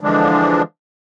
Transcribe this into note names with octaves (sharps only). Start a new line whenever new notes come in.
D3 E3 F3 G#3 D4